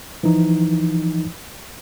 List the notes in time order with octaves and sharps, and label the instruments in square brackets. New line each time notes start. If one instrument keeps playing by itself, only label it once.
[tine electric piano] E3 F3 D#4